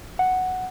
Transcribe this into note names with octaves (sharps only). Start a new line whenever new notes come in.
F#5